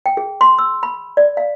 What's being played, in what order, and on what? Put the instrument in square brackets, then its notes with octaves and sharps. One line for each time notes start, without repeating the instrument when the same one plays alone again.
[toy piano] G5
G#4
C6
E6
B5
D5
F5